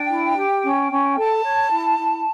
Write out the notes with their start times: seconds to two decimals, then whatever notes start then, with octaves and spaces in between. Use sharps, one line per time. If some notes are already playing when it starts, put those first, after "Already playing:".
Already playing: D4 G5
0.10 E4
0.37 G4
0.63 C#4
0.90 C#4
1.17 A4 A5
1.44 C#5
1.71 E4
1.98 E4